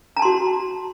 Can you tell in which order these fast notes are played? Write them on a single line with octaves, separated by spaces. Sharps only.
A#5 A5 C6 F#4